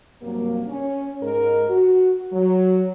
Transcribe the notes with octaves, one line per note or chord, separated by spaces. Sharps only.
G2 C3 F#3 A#3
C#4
G#2 A#4
F#4
F#3